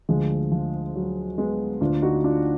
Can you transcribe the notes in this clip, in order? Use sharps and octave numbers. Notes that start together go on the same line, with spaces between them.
D2 D3 F3 G#3
F3
F#3
G#3 B3
D2 D3 D4 F4
D#4 F#4
D4 F4